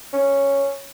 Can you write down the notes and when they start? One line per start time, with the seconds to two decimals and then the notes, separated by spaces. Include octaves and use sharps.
0.13 C#4